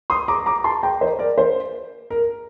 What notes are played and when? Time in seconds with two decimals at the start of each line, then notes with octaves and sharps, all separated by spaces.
0.10 C6 D#6
0.28 A#5 D6
0.46 A#5 D6
0.64 A5 C6
0.83 G5 A#5
1.01 C5 D#5
1.19 A#4 D5
1.38 C5
2.10 A#4